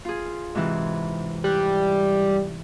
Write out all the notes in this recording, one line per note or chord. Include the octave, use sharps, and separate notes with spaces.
F4 G#4
G#2 C3 E3
G3 F#6